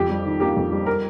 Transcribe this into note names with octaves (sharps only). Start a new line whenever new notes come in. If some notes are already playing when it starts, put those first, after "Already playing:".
Already playing: F2 G4
G3
D#3
A#3 G4
F2
G3
A#4